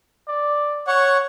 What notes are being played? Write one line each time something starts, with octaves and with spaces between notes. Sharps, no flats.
D5
C#5 F#5 C#6